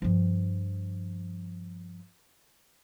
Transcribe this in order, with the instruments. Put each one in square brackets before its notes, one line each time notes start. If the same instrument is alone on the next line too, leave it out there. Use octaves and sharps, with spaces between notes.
[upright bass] G2 F3